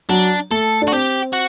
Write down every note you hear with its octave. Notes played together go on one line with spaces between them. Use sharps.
F#3 D4
A3 A4
D4
F#4
C4 G4
F#4